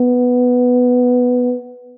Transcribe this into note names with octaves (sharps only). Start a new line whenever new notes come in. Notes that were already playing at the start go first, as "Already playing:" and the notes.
Already playing: B3